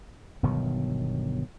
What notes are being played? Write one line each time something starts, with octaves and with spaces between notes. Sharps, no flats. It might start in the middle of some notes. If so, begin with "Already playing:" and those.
G1 B2 D#3 F#3